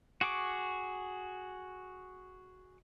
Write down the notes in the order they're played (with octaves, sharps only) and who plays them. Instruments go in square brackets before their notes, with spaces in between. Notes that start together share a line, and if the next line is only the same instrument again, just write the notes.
[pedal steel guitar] F#4 G#4 C#6 D6